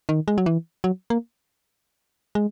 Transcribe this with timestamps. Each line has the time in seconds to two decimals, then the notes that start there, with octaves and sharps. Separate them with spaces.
0.09 D#3
0.28 G#3
0.38 F#3
0.46 E3
0.84 F#3
1.10 A#3
2.35 G#3